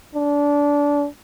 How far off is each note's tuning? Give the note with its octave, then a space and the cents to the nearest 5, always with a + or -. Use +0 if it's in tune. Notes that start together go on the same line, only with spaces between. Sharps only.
D4 -20